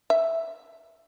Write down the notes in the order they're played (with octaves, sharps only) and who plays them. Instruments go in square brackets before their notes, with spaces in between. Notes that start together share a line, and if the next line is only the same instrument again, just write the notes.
[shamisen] E5